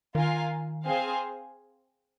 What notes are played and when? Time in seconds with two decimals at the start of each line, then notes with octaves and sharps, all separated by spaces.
0.15 D#3 F4 A#4 F5 G#5
0.86 C4 G#4 C5 F5 G#5